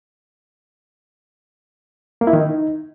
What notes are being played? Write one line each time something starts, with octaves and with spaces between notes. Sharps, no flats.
A#3
E4
D#3
D#4